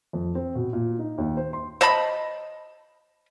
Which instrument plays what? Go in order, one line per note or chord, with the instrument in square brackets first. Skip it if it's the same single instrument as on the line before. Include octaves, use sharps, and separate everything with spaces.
[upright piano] F2
C4
B2
A#2
D#4
D#2
C5
C6
[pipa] C5 D#5 A5 B5